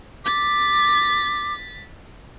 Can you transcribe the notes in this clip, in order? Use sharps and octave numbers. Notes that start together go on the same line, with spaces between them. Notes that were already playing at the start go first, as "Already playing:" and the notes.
D6 A6 B6